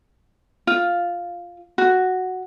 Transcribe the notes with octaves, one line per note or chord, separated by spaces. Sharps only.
F4
F#4